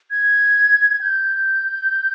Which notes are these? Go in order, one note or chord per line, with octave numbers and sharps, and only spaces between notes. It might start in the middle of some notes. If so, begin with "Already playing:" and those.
G#6
G#6
G6